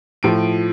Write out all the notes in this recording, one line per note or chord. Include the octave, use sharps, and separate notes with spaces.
A2 F3 D7